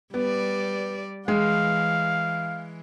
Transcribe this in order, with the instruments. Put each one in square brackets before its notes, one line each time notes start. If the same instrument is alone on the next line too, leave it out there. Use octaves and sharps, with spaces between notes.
[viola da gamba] G3 D5 [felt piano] B3
[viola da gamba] E3 [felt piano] G#3 [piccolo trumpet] F5